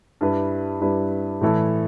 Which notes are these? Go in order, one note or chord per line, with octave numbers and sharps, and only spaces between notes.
G2 G3 E4 B4
G2 G3 E4 B4
A2 E3 A3 E4 A4